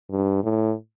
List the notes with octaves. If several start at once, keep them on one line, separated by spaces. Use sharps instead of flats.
G2
A2